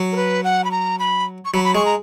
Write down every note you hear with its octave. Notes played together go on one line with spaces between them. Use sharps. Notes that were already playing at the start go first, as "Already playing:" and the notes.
Already playing: F#3
A#4
B4
F#5
B5
A#5
B5
C#6
F#3 B5
B5
G#3 C#6
A#5